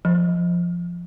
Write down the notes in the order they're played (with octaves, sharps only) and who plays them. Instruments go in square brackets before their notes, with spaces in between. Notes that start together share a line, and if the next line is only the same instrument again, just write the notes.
[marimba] F3